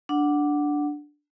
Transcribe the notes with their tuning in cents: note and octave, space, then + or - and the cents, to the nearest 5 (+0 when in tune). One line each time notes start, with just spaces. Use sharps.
D4 +0 F#5 +0